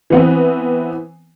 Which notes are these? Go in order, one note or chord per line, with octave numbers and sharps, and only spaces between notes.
E3 B3 C4